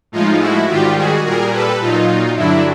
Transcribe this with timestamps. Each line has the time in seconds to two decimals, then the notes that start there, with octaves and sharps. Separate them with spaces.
0.12 A2 F3 G#3 D#4 F4
0.40 E4 F#4
0.68 G#2 D#3 G3 F4 G4
0.97 F#4 G#4
1.24 A#2 G3 G#4 A#4
1.52 A4 B4
1.80 A#2 F#3 D#4 F4
2.36 G2 D3 F#3 D4 E4